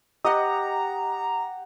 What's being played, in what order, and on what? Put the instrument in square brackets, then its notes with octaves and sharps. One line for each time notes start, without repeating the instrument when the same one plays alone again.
[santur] G4 F#5 [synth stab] D#5 [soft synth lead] A#5